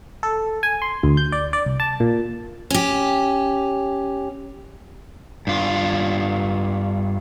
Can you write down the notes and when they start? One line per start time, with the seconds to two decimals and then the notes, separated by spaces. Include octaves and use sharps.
0.23 A4
0.63 G#5
0.82 C6
1.03 D2
1.17 G6
1.32 D5
1.53 D5
1.66 C2
1.80 A5
2.00 A#2
2.70 C#4 G4
5.47 G2 F4